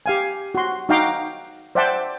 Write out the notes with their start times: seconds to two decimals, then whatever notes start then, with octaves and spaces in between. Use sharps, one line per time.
0.06 G4 F5 G#5
0.55 F#4 C6
0.89 D#4 F#4 F5 G5 A#5 D6
1.75 C5 D5 E5 F#5 G5 A5